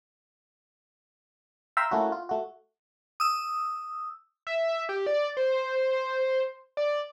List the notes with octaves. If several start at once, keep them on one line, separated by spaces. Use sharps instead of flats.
E5 F5 G5 A#5 C6 E6
A3 A#3 C#4 E4 F#4
F4
A3 F#4
D#6 E6
E5
G4
D5
C5
D5